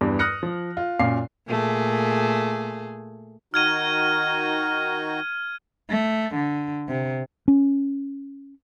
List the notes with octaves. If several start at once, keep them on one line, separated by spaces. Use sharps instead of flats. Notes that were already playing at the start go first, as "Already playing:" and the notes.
E2 G2
D#6 F6 F#6 A#6 C#7
F3
F4
F#2 A#2 F5 C7
A#2 A3 G#4
D#3 D#4 F#4 F6 G#6 D#7
A3
D3
C3
C#4